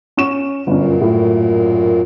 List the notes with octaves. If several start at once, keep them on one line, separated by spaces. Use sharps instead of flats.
C#4 C#6 E7
G1 F#2 A#2 C#4
A2